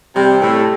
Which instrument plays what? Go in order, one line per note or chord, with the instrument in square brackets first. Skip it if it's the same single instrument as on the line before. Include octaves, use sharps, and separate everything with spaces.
[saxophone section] C3 [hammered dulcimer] G3
[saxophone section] A2 [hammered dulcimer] A4